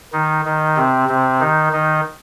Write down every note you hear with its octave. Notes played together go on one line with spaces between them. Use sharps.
D#3 D#4
D#3 D#4
C3 C4
C3 C4
D#3 D#4
D#3 D#4